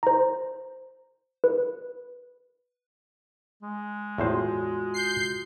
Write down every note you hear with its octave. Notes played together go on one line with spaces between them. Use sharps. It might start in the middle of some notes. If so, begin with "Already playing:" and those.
C5 A#5
B4
G#3
E2 A2 F4 F#4 C5
G6 C7